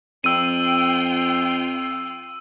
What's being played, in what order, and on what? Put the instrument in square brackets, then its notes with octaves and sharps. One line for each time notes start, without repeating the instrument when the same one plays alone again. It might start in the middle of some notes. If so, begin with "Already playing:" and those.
[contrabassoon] F2 [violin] F4 G5 [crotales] E6 D#7